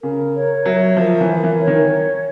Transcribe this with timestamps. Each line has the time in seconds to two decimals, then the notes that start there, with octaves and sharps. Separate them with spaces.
0.03 C#3 A#4
0.34 C#5
0.65 F#3 E5
0.97 F3 A#4
1.21 E3
1.28 A#4
1.44 E3
1.59 C#5
1.67 D#3